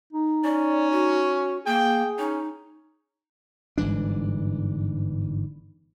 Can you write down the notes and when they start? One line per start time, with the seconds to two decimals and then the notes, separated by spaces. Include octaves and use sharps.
0.13 D#4
0.44 C#4 D5
0.92 F#4
1.66 A#3 G#4 G5
2.19 C#4 D#4
3.78 G1 G#2 E3 D4